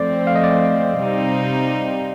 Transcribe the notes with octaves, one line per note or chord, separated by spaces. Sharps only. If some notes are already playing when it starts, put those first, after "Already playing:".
Already playing: F3 A3 C4 D5
F5
D#5
D5
C3 G3 C4 D#4